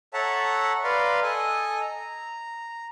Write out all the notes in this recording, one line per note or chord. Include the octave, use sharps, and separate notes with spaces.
A4 C#5 E5 F#5 A5 A#5
B4 D5 F5 A#5 C6
A4 D#5 G#5
A#5